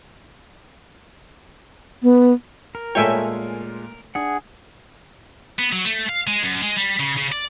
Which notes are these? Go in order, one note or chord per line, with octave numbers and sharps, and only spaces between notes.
B3
A#4
A#2 G#3 A3 F4 C#5 E5 G5 G#5
D4 G#4 F#5
B3
F#3
A3
F5
G#3
F#2
G#3
G3
C#3
C#3
D5